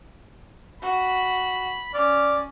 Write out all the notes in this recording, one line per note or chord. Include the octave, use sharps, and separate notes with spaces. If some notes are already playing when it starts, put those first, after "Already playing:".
F#4 B5
C#4 D5 F6